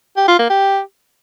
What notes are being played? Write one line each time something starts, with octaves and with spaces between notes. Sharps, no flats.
G4
F4
A#3
G4